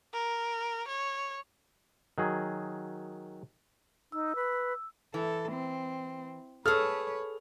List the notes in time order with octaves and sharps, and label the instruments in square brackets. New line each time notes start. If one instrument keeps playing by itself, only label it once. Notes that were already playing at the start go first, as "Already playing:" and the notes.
[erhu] A#4
C#5
[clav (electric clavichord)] D#3 F#3 G#4
[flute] D#4 [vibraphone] E6
[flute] B4
[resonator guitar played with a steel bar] E3 [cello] A4
[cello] C4
[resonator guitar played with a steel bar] G#4 A4 [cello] B4 C#5 [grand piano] F6